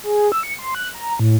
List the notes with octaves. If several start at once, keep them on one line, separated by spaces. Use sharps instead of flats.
G#4
E6
C#7
C6
F#6
A#5
A2